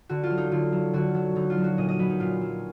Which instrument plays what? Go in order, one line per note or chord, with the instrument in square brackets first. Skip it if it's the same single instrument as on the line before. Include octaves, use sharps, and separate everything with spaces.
[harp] D3 F#4
F4
F#3
D#4
D3 F4
F#3
D3 F#4
F#3
D3 D#4
F4
F#3
F#4
A#2 D#5
D#5
F#3 B4
D#4
A#2 F4
F#3